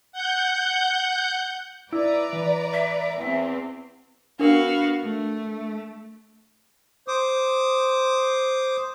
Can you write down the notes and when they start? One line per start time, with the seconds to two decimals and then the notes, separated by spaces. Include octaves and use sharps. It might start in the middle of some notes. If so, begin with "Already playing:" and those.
0.12 F#5 G6
1.93 E4 B4 D5 A#5
2.33 E3
2.73 E5
3.18 E2 C4
4.39 B3 D4 F#4 A#4 F5
5.03 A3
7.08 C5 D6 D#6